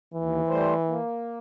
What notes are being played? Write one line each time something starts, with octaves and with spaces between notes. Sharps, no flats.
D#2 E3
G3 A3 C5
A#3